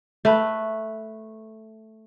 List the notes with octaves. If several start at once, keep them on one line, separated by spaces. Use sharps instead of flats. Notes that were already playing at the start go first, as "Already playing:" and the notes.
A3 B4